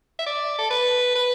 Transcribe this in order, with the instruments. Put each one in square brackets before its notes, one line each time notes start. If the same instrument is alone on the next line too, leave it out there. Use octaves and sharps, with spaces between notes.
[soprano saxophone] E5
D5
A4
B4
B4